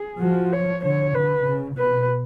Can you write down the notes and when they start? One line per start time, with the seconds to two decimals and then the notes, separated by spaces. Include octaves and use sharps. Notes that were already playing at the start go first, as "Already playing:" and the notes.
Already playing: G#4
0.21 F3 F#4
0.52 C#5
0.84 D3 C#5
1.15 D3 B4
1.47 C#3
1.78 B2 B4